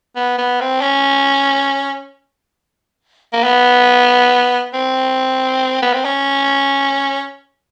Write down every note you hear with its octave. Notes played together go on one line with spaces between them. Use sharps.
B3
B3
C4
C#4
A#3
B3
C4
B3
C4
C#4